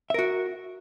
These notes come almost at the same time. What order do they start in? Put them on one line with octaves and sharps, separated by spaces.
E5 A#4 F#4